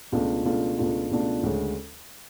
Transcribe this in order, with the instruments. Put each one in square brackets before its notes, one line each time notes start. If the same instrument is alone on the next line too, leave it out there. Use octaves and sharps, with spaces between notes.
[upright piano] C#2 B2 A3 D4 F4
C#2 B2 A3 D4 F4
C#2 B2 A3 D4 F4
C#2 B2 A3 D4 F4
D2 C#3 G#3 C#4